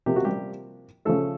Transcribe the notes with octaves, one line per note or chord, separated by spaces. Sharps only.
C3 F3 A#3 G4
F#4
G3 G4
C#3 F3 A3 A4